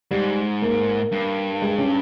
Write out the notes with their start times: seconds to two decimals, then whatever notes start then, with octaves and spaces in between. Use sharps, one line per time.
0.11 G#2 G3
0.62 A#3
1.12 G2
1.62 G#3
1.78 C#4